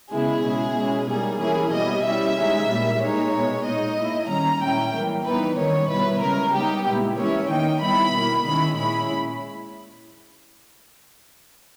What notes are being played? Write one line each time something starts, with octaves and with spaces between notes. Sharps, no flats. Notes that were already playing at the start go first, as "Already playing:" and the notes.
C#3 G#3 B3 E4 G#4
B2 G#3 C#4 E4
B2 G#3 C#4 E4
G3 A#3 D#4 G#4
E3 A#3 C#4 E4 G#4
B2 G3 B3 E4 D#5
G3 C#4 E4 E5
D#3 G#3 D#4
A#2 G3 A#3 E4
A#2 G#3 D#4 C#5
B2 G#3 B3
A#2 A#3 D#4 D#5
A#2 A#3 E4
D#3 G3 C#4 A#5
A#2 G#3 C#4 E4 G5
E3 G3 A#3
E3 G3 B3 D#4 B4
D#3 G3 A#3 C#4 C#5
B2 G3 B3 E4 B4
C#3 G#3 C#4 A#4
G3 B3 D#4 G4
A#2 G#3 B3 E4
E3 A#3 C#4 E4 C#5
D#3 A#3 D#4 G5
G3 B3 E4 B5
B2 A#3 E4
D#3 G#3 C#4 E4 B5
A#2 G#3 C#4 E4 B5